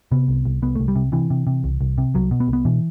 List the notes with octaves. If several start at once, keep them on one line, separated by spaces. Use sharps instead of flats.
C3 B3
C2
C2
C2 B3
C2 A3
G3
C3
C3 E3
C3
C3
C2
C2
C3
C2 F#3
B2
B3
C2
B3
B2 E3